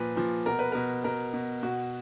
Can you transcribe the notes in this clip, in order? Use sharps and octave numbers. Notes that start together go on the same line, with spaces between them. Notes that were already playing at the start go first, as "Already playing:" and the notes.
Already playing: A#2 F3 B4
A#2 F3
B2 A#4
B4
B2 A#4
B2 A#4
B2
B2 F#4